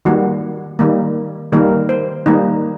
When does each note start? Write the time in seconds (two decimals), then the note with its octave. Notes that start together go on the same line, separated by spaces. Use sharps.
0.05 D#3 G3 A#3 F#4
0.79 D#3 G3 A#3
1.53 D#3 G3 A#3 A#4
1.89 C5
2.26 D#3 G3 A#3 D#4